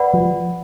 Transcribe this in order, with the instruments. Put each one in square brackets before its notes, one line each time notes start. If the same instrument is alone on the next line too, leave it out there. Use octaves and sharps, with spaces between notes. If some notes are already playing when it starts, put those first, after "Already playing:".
Already playing: [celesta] B4 D5 F#5 B5
[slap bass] F3